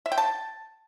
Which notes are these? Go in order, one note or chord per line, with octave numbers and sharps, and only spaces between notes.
E5
G5
A5